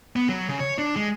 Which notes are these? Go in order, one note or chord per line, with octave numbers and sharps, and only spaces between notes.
B3
F#3
C#3
C#5
D4
G#3